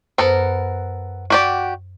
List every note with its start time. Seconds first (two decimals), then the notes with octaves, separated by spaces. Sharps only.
0.18 F#2 B3 A4 A#4 C5
1.30 F#4 G4 D5